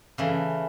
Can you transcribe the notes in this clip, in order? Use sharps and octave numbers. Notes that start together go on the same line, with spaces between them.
C#3 E3 A3